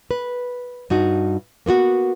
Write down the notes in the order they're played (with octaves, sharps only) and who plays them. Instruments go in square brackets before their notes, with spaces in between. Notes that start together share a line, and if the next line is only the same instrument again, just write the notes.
[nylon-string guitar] B4
G2 D#4 F#4
A#3 B3 F4 F#4